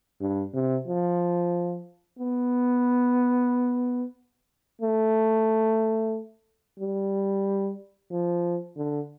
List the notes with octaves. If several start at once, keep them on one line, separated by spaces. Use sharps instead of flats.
G2
C3
F3
B3
A3
G3
F3
D3